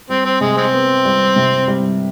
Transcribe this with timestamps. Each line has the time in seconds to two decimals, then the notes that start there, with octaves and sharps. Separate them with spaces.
0.09 G3 C4
0.25 C4
0.41 C3 G#3
0.57 G#3 C4
0.73 B3
1.05 G3
1.36 C3
1.68 G3